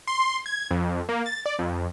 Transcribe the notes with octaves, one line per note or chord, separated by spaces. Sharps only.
C6
G#6
F2
A#3
A6
D5
F2